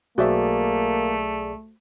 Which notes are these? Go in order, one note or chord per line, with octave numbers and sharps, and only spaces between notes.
B1 A3 A#3 F#4 G#4 C5 D5 E5